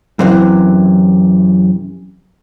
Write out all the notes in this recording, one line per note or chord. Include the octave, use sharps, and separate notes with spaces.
F#2 C3 E3